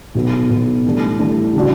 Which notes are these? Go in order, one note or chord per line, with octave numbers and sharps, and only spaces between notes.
B1 B2 F#3 B3
B1 B2 F#3 B3
A2 E3 G3 D4 A4
A2 E3 G3 D4 A4
C#3 G3 D4 F#4